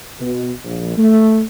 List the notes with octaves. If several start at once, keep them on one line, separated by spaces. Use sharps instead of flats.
B2
A#1
A3